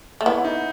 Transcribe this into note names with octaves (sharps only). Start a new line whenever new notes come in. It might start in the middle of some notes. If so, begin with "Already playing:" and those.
A3
B3 E4
D#4